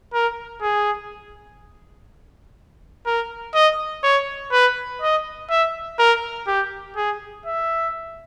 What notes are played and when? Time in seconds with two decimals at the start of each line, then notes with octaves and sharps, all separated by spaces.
0.13 A#4
0.62 G#4
3.06 A#4
3.54 D#5
4.03 C#5
4.52 B4
5.02 D#5
5.50 E5
5.99 A#4
6.47 G4
6.96 G#4
7.46 E5